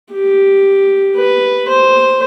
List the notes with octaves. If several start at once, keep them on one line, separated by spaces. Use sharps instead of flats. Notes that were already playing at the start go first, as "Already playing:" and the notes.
G4
B4
C5